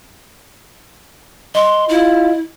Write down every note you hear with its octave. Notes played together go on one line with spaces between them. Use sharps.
D#5 C6
E4 F4